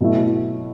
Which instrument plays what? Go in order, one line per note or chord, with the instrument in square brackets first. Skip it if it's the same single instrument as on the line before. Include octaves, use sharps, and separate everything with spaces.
[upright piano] B2 F#3 A3 E4